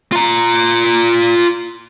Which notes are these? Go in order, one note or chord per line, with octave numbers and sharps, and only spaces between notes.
F4 A#5